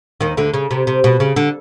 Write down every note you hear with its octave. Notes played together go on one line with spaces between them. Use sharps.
D#2 D#3
D2 D3
C#3
C3
C3
B2
C#3
D3